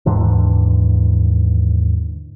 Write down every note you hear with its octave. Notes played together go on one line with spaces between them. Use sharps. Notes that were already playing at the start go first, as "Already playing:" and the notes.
D#2 G#2 D3 E3